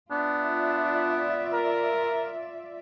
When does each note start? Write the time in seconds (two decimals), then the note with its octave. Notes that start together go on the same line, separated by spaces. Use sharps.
0.11 B3 D4 F4 D5 E5
1.53 A#4